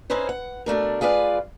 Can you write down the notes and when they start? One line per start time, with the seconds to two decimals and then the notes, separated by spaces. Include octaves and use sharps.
0.10 C4 C#4 D#4 E4 B4 C5
0.29 F#5
0.66 B2 A3 D4 A#4
1.01 F4 G#4 B4 D5 F5